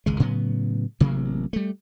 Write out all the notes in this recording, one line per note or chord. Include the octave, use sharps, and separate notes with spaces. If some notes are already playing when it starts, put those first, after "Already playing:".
G#1 C#2 G#3
A2 C#3 F#3 B3
A1 C3 F#3 A#3
G3 A3